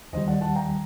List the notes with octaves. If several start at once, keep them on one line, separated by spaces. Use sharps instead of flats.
D#2 D#3 G3 C5 D#5
D5 F#5
F#5 A5
G5 A#5